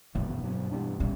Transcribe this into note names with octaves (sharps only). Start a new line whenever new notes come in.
F#2 B2 E3 B3
G2 F#3 B3
G2 E3 G3 D4
B2 G3 C#4